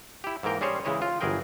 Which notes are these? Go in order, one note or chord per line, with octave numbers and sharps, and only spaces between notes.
E4 G4
G#2 E3 A#3 A#4 G5
G3 C#4 G#4 C5 C#5
C#3 E3 G#3 E4 C#5 D#5
F4
G1 E3 F#3 G#4 A#4 G5